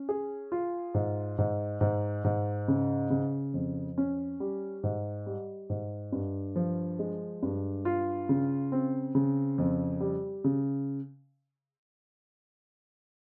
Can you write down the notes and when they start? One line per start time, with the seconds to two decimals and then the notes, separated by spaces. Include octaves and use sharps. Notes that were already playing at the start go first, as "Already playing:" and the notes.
Already playing: C#4
0.09 G#4
0.52 F4
0.94 G#2
1.38 G#2
1.81 G#2
2.24 G#2
2.68 C#3
3.10 C#3
3.54 F2
3.98 C#4
4.40 G3
4.83 G#2
5.26 G3
5.70 G#2
6.12 G2
6.56 F3
6.99 G#3
7.43 G2
7.85 F4
8.29 C#3
8.72 C4
9.15 C#3
9.58 F2
10.00 G3
10.44 C#3